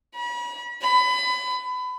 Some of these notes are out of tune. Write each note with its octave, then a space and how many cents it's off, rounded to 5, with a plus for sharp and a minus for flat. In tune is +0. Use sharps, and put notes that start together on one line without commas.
B5 -40
B5 +25